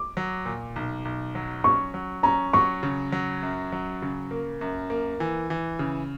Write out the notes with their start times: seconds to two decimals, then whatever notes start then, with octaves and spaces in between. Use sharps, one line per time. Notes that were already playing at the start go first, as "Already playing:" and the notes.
Already playing: D6
0.17 F#3
0.46 A#2
0.76 B1
1.05 B1
1.35 F#3
1.64 C#4 C#6
1.94 F#3
2.23 C#4 A#5
2.53 F#3 C#6
2.83 C#3
3.12 F#3
3.43 F#2
3.72 F#3
4.02 C#3
4.31 A#3
4.61 F#2
4.90 A#3
5.20 E3
5.50 E3
5.79 C#3